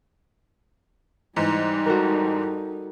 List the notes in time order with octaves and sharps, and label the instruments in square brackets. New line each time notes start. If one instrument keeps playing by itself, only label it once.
[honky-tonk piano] G#2 E3 [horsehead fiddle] G3 D#4
[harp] F#4 A4 A#4